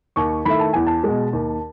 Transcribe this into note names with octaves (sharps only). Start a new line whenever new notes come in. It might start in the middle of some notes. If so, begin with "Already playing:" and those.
D#2 C#6
D#3 A3 E4 B5
A5
E2 G#5
A5
B2 G#3
D#2